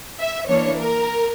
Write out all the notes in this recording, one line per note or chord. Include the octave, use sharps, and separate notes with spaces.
E5
E3 A#3 D4 C#5
A#4